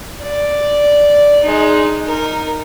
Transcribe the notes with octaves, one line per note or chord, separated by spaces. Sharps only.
D5
G#3 D#4
D#4 A#4